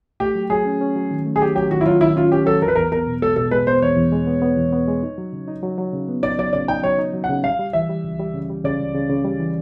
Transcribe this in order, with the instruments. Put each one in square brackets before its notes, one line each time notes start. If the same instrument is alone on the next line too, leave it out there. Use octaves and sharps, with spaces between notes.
[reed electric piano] A3 [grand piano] G4
[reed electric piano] F#3
[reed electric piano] F#3 [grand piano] G#4
[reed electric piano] C#4
C#4
F#3
D#3
A3
[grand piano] G#4
[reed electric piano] F#3 [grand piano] G4
[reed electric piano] F#3 [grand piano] G4
[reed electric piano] D#3 [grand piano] F#4
[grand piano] E4
[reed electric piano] F#3 [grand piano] F4
[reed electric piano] D#3 [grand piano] E4
[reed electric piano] C#4 [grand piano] F4
[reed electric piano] C#4 [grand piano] G4
[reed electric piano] F#3 [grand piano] A4
[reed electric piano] E2 [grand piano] A#4
[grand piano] B4
[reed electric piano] E2 [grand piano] A#4
[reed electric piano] B3 [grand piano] A#4
[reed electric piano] B2
[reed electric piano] G#3 [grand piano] A4
[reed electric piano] B2 [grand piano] A4
[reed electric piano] G#3 [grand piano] B4
[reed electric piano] B3 [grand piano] C5
[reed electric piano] E2 [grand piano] C#5
[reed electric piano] E2
G#3
B3
B3
E2
B3
G#3
D#4
F#3
C#3
D#4
F#3
F#3
C#3
B3
[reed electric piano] D#4 [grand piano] D5
[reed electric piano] F#3 [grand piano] D5
[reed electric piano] C#3 [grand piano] D5
[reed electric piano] D#4 [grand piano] G5
[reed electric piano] F#3 [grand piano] C#5
[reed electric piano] D#4
F#3
[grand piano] F#5
[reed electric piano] C#3
[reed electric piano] G3 [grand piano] F5
[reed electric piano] G3
[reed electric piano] E3 [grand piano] E5
[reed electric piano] G3
C#2
G3
C#3
G3
[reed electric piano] C#3 [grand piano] D5
[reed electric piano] C#2
C#3
C#3
G3
E3